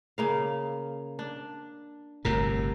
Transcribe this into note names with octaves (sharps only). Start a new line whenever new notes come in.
C#3 A#3 F5
D4
G1 A2 C3 A#4